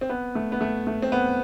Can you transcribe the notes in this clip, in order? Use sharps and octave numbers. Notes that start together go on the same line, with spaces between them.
C4
B3
A3
B3
A3
A3
C4
B3